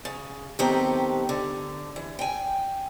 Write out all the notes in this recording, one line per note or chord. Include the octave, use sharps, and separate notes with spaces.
C#3
D#3 F#3 B3 C4 G4 A4
D3
E3
G5 G#5